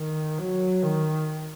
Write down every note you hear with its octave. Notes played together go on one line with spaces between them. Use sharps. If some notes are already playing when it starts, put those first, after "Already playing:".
Already playing: D#3
F#3
D#3